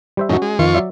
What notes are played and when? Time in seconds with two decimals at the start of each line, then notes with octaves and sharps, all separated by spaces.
0.17 G3 C5 E5
0.29 F#2 A2 D#3 C#4 F#4
0.42 G#3
0.59 F2 D#3 F4 C#6
0.75 F#3 D5 E5